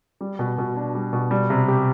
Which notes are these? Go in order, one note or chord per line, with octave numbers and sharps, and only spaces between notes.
G3
B2
B2
D4
G3
B2
G3
C3
G4